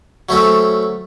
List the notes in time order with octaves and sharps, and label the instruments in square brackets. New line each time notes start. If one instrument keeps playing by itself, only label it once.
[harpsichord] F#3 A3 C4 C#4